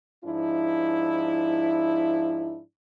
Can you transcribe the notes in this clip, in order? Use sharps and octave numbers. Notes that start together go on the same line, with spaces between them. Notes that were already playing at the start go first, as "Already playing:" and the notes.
G#2 F3 D4 E4